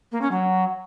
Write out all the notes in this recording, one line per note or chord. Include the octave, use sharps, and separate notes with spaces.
A#3
C#4
F#3